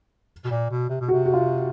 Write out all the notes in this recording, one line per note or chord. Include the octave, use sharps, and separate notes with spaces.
B2
A#2
B2
C3
B2
C3 F#4
F#4
F4